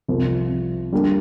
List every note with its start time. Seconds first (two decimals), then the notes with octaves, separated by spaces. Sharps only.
0.08 C2 C3 F3
0.92 D3 G3 A#3 D4